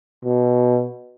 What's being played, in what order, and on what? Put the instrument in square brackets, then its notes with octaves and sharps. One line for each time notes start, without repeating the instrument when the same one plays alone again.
[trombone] B2